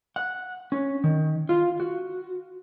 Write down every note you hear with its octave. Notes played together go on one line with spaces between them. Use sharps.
F#5
C#4
D#3
F4
F#4